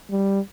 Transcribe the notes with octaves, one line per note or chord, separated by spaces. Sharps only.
G3